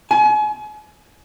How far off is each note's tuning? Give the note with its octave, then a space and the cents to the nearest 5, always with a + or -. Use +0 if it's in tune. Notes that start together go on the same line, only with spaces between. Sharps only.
G#5 +35